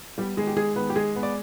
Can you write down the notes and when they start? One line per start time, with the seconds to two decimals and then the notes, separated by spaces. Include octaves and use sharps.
0.18 G3 B3 G4
0.37 D#3 G#3 G#4
0.47 G4
0.57 G#3 G#4
0.76 D#3 B3 B4
0.90 G4
0.96 G#3 G#4
1.16 B3
1.23 D5